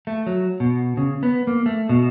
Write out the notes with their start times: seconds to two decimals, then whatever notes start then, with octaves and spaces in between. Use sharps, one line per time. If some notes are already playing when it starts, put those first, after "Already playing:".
0.07 A3
0.27 F#3
0.60 B2
0.97 C#3
1.23 B3
1.47 A#3
1.66 A3
1.89 B2